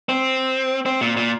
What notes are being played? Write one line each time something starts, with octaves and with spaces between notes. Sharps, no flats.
C4
C4
A#2
A#2